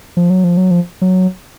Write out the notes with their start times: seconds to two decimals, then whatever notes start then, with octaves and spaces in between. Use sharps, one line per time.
0.17 F3
0.30 F#3
0.44 F3
0.57 F#3
0.71 F3
1.02 F#3